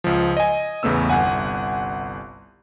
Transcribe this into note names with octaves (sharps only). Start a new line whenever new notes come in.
C#2 F3
D#5 G#5
A1 E2 C#3 A3 B3 E6
G1 C2 F#5 G#5